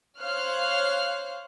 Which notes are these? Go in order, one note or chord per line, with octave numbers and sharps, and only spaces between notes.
C5 C#5 F5 F6 F#6